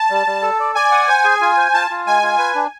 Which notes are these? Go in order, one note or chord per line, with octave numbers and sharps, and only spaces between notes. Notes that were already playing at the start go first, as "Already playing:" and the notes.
Already playing: A5
G3
G3
A4
D5
D5 G#5
F#5
C5 G#5
G#4
F4
C5
F4 A5
F4
G#3 G#5
F4
B4 G#5
D4